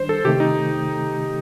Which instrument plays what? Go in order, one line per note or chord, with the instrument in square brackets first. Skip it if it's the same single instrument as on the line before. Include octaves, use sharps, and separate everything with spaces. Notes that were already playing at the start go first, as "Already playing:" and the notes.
Already playing: [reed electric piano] D#3 G3 D4 [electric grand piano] C5
[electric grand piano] A4
[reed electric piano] C3 D#3 A3 [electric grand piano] G4
[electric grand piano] D#4